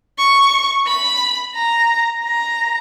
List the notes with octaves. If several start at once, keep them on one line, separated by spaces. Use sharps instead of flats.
C#6
B5
A#5
A#5